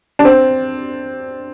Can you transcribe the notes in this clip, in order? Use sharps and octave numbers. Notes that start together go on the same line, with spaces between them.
D4
C4